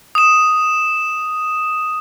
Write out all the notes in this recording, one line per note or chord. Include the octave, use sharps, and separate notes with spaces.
D#6 E7